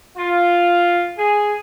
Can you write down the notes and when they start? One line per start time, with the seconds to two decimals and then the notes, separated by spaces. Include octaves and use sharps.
0.17 F4
1.18 G#4